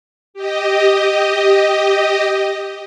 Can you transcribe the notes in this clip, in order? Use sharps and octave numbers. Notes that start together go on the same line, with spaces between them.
G4 D#5